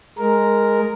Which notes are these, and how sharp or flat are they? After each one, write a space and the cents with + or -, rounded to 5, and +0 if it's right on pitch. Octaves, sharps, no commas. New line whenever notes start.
G#3 +0 A#4 +0